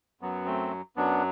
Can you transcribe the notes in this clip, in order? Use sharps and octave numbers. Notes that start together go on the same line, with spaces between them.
F#2 F#3 B3
A3 C4
F#2 F#3 B3 D4